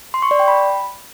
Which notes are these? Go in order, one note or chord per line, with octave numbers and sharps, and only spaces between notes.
C6
C#6
D5
G5
B5